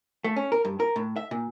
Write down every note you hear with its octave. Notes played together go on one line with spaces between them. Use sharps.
A3
C#4
A#4
G2
A#4
A2
E5
A#2